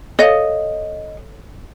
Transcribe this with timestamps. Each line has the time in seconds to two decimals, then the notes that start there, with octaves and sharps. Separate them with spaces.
0.19 A4 C#5 D#5 F5